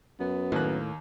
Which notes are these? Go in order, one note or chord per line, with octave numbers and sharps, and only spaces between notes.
F#2 B3
D#2 A2 A#3 F#6